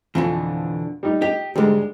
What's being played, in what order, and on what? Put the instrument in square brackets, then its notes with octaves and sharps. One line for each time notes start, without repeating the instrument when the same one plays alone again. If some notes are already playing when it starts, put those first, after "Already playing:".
[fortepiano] F2 [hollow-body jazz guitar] B2 D3 E3
[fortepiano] G3 D#4
[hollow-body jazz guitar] G4 [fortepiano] D#5
[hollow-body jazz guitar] D2 G#2 [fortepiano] G3 G#3